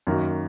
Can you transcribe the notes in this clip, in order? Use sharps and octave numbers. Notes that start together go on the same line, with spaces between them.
F#2 D#3 A#3 F#4